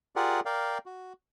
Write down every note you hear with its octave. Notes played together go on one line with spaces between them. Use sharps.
F4 G4 G#4 A#4 D5 F#5
A#4 D5 F5 G5
F#4